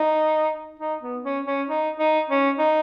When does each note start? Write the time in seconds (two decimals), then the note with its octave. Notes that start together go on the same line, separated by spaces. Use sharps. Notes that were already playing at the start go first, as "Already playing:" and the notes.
Already playing: D#4
0.80 D#4
1.02 B3
1.24 C#4
1.47 C#4
1.69 D#4
1.99 D#4
2.30 C#4
2.59 D#4